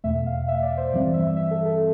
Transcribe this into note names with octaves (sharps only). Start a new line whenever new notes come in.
E2 B2 A3 E5
F5
E5
D5
C5
G2 E3 G3 C4 D5
E5
E5
A4
A4